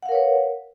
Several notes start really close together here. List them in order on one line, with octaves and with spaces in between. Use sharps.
F#5 F5 A#4 C#5 B4